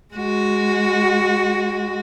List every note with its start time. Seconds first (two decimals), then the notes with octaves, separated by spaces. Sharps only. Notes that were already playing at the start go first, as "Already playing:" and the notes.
0.14 G#3 F#4